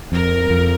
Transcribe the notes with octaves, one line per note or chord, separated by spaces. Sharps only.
F2 A#4
F2